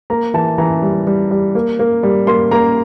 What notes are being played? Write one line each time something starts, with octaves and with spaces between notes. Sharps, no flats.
A#3 A#5
E3 A5
E3 A#5
G3
G3
G3
A#3
A#3
G3
A#3 C6
A#3 A#5